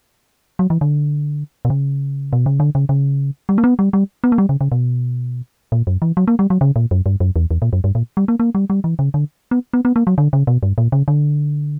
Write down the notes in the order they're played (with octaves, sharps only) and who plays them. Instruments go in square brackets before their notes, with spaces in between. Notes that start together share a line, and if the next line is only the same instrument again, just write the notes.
[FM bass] F#3
E3
D3
B2
C#3
B2
C#3
D3
C#3
C#3
G3
A#3
B3
G3
G3
B3
A#3
G3
C#3
C#3
B2
A#2
F#2
E3
F#3
A#3
G3
F#3
C#3
A#2
F#2
G2
F#2
E2
E2
A#2
F#2
G2
A#2
G3
A#3
A#3
G3
G3
E3
C#3
D3
B3
B3
B3
A#3
F#3
D3
C#3
B2
G2
A#2
C#3
D3